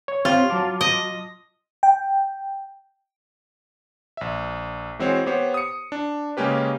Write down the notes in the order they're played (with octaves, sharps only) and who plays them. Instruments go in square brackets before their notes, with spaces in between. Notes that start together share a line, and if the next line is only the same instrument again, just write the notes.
[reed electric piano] C#5
[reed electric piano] C4 G4 C#5 [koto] F4
[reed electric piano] F#3 A5 D6
[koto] D#5
[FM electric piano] G5
[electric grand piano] A#1 E5
E3 G#3 C4 F#4 C5 C#5
B3 G4 C5 C#5
D#6 C#7
D4
C#3 G#3 A#3 C#4 G4 B4